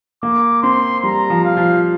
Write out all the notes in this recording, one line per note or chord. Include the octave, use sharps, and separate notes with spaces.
A#3 D6
C4 C6
G3 A#5
F3
F5
F3